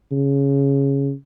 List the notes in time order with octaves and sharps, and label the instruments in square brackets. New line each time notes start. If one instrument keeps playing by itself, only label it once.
[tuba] C#3